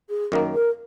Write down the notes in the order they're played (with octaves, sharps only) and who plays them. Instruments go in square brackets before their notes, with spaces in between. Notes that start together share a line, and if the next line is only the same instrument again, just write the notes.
[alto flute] G#4
[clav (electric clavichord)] F#2 D#3 A#3
[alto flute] A#4